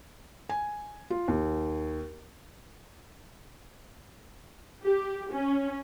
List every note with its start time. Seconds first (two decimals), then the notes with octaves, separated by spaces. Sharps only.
0.49 G#5
1.10 F4
1.28 D#2
4.84 G4
5.32 C#4